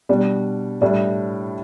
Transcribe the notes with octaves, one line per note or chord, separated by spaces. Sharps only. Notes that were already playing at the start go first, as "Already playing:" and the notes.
B2 G3 D4
A2 G3 D4